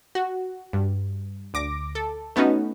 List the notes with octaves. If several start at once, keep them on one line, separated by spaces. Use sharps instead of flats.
F#4
G2
D2 D6 A#6
A4
A3 B3 C#4 D#4 F#4